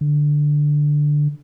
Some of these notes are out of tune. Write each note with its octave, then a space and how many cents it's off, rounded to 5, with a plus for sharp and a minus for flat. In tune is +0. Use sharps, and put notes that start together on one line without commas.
D3 +5